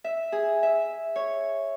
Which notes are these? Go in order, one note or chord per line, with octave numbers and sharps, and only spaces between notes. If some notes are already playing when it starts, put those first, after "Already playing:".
E5
G#4
E5
C#5